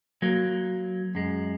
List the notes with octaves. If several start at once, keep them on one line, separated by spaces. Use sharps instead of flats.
F#3 A#3
F#2 G#3